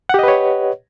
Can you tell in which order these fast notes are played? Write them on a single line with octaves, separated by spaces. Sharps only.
F#5 G4 D#5 B4 C#5